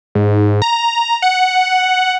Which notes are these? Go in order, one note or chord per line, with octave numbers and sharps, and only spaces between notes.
G#2
A#5
F#5